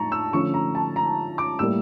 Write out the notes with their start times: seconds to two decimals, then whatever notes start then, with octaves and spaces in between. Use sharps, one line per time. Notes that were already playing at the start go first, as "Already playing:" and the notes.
Already playing: A2 F3 A#3 D4 A5 A#5 C#6
0.12 E6
0.33 D3 F3 A3 C#4 C#6
0.54 A#5
0.75 A5
0.96 A#5
1.38 D6
1.59 A2 G3 A#3 E6